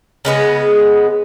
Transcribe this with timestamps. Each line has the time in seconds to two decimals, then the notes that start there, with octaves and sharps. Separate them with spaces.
0.25 C#3 G#3 B3 G#4